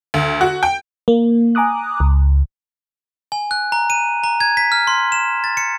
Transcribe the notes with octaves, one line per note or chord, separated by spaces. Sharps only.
D2
F#4
G5
A#3
G#5 A#5 D6 D#6 F#6
C#2
G#5
F#6
A#5
D#7
A#5
G#6
B6
F6
C6
E7
A6
C#7